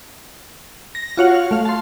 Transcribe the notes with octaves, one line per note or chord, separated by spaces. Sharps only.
A#6
F4 F#4 C#5 F5 F#5
F6
A3 F5
A5 C6